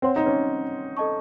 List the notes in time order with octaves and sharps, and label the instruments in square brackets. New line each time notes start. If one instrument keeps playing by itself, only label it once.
[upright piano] C4 [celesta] C#5 F#5 C6
[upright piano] D#4
C#4
[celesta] A4 D#5 A5 C#6